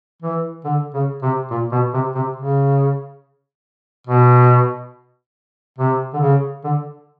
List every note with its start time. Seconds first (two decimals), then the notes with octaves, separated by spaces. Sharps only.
0.22 E3
0.64 D3
0.94 C#3
1.22 C3
1.51 A#2
1.72 B2
1.93 C3
2.15 C3
2.36 C#3
4.07 B2
5.78 C3
6.13 D3
6.21 C#3
6.64 D3